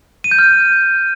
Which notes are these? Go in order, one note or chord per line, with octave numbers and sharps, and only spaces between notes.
D#7
G6
F6